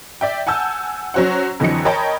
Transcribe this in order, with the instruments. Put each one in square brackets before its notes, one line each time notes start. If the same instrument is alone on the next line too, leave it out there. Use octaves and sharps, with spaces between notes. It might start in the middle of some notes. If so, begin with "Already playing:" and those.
[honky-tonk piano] D5 E5 G5
F#5 G#5 A5 E6 G6
F#3 C#4 F#4 C5 F#5
F2 D3 E3 F#3 D#5 C#7
A#4 C#5 D#5 G5 A5 B5